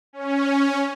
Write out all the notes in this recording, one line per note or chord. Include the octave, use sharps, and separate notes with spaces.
C#4